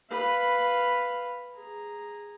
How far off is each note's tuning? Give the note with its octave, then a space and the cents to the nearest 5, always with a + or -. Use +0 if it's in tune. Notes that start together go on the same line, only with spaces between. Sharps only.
B4 +0 F5 -5
G#4 -10 A#5 +0